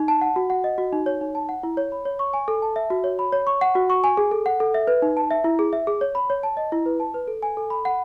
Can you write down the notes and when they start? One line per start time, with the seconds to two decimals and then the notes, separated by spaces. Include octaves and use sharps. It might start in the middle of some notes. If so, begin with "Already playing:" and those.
Already playing: D#4
0.08 A5
0.21 F#5
0.36 F#4
0.50 F#5
0.64 D#5
0.78 F#4
0.93 D#4
1.06 C#5
1.21 D#4
1.35 A5
1.49 F#5
1.63 E4
1.77 C#5
1.92 B5
2.05 C#5
2.19 C#6
2.34 G#5
2.48 A4
2.62 A5
2.76 E5
2.90 F#4
3.04 C#5
3.19 B5
3.32 C#5
3.47 C#6
3.61 F#5
3.75 F#4
3.90 C#6
4.04 G#5
4.17 G#4
4.31 A4
4.46 F#5
4.60 A4
4.74 E5
4.87 B4
5.02 D#4
5.17 A5
5.31 E5
5.44 E4
5.59 G#4
5.73 E5
5.87 G#4
6.01 C#5
6.15 B5
6.30 C#5
6.43 A5
6.57 D#5
6.72 E4
6.86 B4
7.00 A5
7.14 B4
7.28 A4
7.43 G#5
7.57 A4
7.70 B5
7.85 F#5